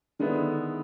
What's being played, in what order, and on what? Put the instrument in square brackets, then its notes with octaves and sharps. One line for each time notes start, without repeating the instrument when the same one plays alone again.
[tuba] D3 [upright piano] D#3 G#3 B3 E4